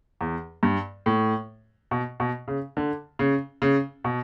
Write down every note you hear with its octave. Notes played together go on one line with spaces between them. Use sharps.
E2
G2
A2
B2
B2
C#3
D3
C#3
C#3
B2